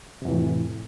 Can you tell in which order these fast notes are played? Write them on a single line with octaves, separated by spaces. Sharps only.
C3 F2 E3 A2